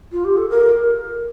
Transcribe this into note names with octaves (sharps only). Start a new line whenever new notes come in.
F4
G4
A4
A#4